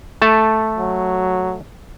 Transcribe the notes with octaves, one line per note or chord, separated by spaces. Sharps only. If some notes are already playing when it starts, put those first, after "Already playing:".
A3 A5
F#3